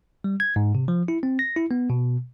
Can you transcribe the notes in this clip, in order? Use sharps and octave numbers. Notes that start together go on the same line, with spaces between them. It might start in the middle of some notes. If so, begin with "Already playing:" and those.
G3
G#6
G#2
C3
F3
E4
C4
A#6
E4
B3
B2